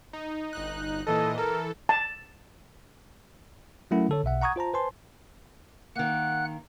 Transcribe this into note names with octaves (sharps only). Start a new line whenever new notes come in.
D#4
G1 D#4 F#6
A#2 E3 A4 D#5
E3 A4 A#4
A5
F#3 A3 C#4 E4 A#4 F#5
D3 A4 C#5
B1 B2 E5 F#5
F#5 A#5 C#6 D#6 G#6
F4 C5 A5 A#5
B4 C5 G#5 A5 C6
D#3 A#3 F#5 F#6